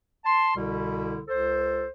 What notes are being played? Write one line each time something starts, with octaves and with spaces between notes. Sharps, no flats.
A5 C6
C2 B2 D3 G3 E4
C#2 A4 C5